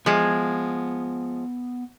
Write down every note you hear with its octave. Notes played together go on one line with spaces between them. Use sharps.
F3 G#3 B3 G#5